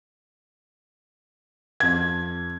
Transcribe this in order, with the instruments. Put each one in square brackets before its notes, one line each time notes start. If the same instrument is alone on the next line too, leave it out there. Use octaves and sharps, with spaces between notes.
[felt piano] F2 G#6